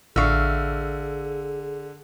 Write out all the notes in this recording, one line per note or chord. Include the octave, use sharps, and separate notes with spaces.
A1 D3 G#4 E5 F5 C#6